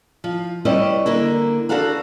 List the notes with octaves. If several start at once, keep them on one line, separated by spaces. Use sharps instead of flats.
F3
G3 C#4 E4 B4 D5 D#5
D3 A#3 E4
D4 F#4 A4 B4 F5 F#5